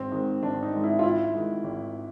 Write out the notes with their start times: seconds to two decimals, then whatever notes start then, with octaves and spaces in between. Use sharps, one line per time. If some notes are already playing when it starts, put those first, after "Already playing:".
Already playing: G#1 C4
0.12 G#2 D#3
0.43 G#1 D4
0.63 D#4
0.73 G#2 D#3
0.84 E4
0.99 F4
1.03 G#1 E4
1.34 G#2 D#3
1.64 G#1